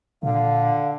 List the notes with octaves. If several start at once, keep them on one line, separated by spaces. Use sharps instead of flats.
A#2 D3 F5